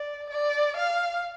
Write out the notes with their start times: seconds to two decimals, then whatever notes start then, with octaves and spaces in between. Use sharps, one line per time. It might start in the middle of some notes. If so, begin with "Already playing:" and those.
Already playing: D5
0.30 D5
0.76 F5